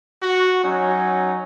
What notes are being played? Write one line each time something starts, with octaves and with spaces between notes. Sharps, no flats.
F#4
F#3 C#4 D#4